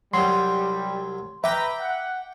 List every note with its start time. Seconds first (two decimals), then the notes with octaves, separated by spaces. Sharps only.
0.14 C2 F#3 G3 C6
1.44 B4 E5 G5 A#5 D6
1.80 F#5